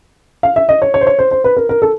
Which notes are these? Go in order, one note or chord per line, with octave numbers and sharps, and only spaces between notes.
F5
E5
D#5
C#5
C#5
C5
C#5
C5
C5
B4
A#4
A#4
A4